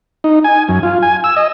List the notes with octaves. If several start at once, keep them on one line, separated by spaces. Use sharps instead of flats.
D#4
G#5
F#2
F4
G#5
E6
D#5